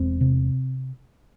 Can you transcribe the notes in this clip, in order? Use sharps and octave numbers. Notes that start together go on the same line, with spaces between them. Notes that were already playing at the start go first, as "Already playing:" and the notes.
Already playing: E1 C4
C3